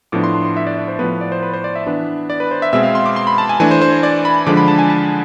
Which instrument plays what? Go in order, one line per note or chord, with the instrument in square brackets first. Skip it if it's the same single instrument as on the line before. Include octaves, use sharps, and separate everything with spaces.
[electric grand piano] A2 F3 B3 D4 D6
C6
C6
C6
E5
D5
D5
C5
A2 F3 B3 B4
D5
C5
B4
C5
D5
E5
E3 B3 D4
D5
B4
C5
E5
B2 G#3 C4 E5
F5
C6
D6
C6
B5
A5
G#5
E3 A3 D4 G#5
C5
C5
C5
D5
B5
D3 F3 G#3 D4 D6
B5
A5
G#5
A5